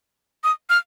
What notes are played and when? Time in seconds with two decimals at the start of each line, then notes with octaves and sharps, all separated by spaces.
0.44 D#6
0.70 F6